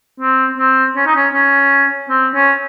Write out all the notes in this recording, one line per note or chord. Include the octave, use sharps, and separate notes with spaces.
C4
C4
C#4
D#4
C#4
C#4
C4
C#4